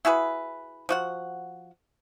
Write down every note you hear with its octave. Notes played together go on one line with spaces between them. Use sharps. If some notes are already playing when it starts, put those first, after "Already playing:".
E4 F#4 G#4 B4
F3 F#4 F#5